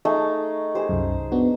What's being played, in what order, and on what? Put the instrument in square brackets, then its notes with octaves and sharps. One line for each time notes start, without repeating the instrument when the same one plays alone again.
[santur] A3 D#4 G#4
[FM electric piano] G4 [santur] G#4 C5
[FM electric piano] C2 F#2
B3 D4 F#4